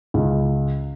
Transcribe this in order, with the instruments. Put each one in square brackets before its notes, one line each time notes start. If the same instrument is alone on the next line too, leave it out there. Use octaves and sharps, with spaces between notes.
[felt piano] C#2